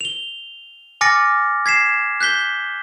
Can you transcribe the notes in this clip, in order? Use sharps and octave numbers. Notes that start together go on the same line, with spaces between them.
F7 G7
G#5 D6 F6 A6 A#6 C#7
G#6 B6 C7 E7
F#6 G6 B6 G7